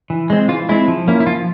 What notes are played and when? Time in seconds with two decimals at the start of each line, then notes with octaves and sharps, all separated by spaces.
0.10 E3
0.30 G#3 C4
0.48 E3 F4
0.69 G#3 C4 E4
0.88 F3
1.08 A#3 C#4 E4
1.20 E4
1.27 F3 F4